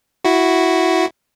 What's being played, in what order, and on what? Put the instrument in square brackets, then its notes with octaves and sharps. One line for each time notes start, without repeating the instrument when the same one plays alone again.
[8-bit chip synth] E4 F#4